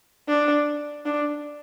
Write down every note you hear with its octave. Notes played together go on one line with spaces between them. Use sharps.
D4
D4